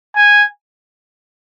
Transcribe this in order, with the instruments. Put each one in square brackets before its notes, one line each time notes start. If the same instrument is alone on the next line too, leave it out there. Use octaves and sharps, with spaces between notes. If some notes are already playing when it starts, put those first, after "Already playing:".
[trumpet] G#5